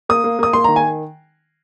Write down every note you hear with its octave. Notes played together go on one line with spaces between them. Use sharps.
A#3 D#6
A#3
A#3 D#6
A#3 C6
D#3 A#5
G#5